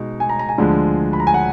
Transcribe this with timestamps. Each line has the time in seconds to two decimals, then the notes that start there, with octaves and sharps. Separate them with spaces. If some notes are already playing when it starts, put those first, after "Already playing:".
Already playing: B2 G#3 D#4
0.20 G#5
0.29 A#5
0.39 A#5
0.49 G#5
0.58 D2 D3 F3 G#3
1.13 B5
1.20 A#5
1.27 G#5
1.34 F#5